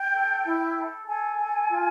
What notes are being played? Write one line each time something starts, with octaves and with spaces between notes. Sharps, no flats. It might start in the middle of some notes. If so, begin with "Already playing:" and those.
Already playing: G5
A4
E4
A4
A4 G#5
A4
F4